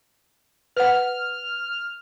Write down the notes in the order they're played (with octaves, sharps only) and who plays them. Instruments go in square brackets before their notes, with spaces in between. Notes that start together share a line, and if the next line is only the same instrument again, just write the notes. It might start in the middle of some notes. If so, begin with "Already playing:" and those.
[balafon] B4 F#5 [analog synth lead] F6